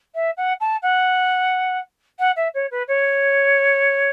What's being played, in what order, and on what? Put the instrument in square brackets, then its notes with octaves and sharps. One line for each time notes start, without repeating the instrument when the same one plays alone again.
[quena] E5
F#5
A5
F#5
F#5
E5
C#5
B4
C#5